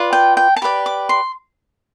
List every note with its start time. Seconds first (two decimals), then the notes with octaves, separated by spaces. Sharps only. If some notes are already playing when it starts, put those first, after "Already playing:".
Already playing: F4 B4 D5
0.13 G5
0.37 G5
0.56 A5
0.62 G4 B4 D5 B5
0.86 D6
1.09 C6